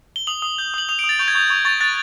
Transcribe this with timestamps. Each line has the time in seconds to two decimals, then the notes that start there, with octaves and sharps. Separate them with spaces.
0.16 G7
0.27 D#6 F#7
0.42 D#6
0.58 G6
0.74 D#6 F#7
0.89 D#6 F7
0.99 D7
1.04 D#6
1.09 A6
1.19 C#6 G6
1.28 G#6
1.35 C#6 G6
1.50 C#6 G#6
1.65 C#6 A6
1.81 F#6 A6